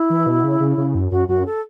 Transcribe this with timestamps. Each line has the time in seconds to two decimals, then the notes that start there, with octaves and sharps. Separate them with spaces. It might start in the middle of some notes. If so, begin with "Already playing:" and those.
Already playing: E4
0.10 E3
0.27 B2
0.44 C#3
0.60 C#3
0.77 C#3
0.95 F#2
1.11 F#2 F#4
1.28 F#2 F#4
1.46 A4